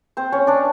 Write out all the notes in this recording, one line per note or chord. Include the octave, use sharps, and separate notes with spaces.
C4 C5
C#4 C#5
D4 D5